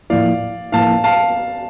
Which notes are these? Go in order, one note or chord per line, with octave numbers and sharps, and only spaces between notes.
A2 F3 A#3 E4 D5 F5
A2 F3 A#3 E4 F5 A5
F5 A5